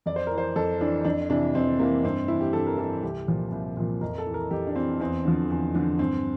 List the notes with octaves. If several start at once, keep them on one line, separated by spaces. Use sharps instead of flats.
F2 D5
C5
E3 A#4
C5
F2 A4
E3 D4
F2 D4
C3 E3 D4
F2 C4
C3 E3 A#3
G2 C4
E3 E4
G4
G2 A4
A#4
E3 A4
C2 G4
A#2 F3
C2
A#2 F3
F2 A#4
A4
E3
A#4
F2 G4
D4
E3 C4
E2 C4
D3 F3
E2
D3 F3
G2 C4